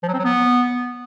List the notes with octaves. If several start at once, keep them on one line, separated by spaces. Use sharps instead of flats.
F3
F#3
C4
F#3
B3